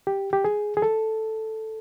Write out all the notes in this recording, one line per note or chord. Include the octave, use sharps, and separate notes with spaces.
G4
G4
G#4
G#4
A4